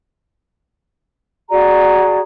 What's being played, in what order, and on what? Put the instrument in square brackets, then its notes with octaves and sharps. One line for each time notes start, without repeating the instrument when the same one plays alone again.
[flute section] F#4 G#4 D5 A#5